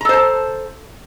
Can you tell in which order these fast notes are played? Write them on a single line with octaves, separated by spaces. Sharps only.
A#5 A4 C5 A5